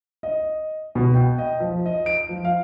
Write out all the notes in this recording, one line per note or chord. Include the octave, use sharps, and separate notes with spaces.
D#5
B2
G5
D#5
F3
D#5
D7
F3
F5